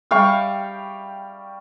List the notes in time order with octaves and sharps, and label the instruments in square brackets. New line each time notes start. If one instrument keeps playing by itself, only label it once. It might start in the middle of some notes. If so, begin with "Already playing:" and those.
[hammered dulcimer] G3 F5 G5 C#6